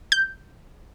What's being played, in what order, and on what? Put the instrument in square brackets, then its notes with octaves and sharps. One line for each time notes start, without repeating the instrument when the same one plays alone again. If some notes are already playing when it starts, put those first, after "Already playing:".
[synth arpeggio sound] G6